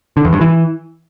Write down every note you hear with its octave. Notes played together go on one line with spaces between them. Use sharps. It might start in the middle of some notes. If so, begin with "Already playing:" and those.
D3
E2
G2
E3